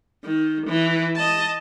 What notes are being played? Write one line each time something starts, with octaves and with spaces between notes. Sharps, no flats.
D#3
E3
D#5 A5